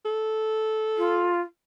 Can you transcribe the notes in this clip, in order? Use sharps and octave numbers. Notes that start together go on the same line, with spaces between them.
A4
F4